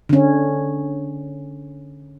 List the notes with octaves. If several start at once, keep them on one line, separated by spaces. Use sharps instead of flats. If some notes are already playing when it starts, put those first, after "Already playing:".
D3 C#4